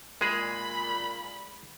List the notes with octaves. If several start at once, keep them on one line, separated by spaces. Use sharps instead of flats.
A#2 G#3 G#4 B5